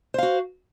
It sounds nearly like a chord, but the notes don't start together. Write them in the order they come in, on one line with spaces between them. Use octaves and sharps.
C5 F5 F#4